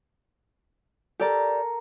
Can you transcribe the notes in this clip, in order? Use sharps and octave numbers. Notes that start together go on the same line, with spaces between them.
G4 A4 A#4 D5